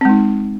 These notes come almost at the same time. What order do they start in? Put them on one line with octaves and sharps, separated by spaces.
C4 G#3 D#4